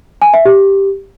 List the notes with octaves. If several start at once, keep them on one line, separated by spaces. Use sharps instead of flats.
G#5
E5
G4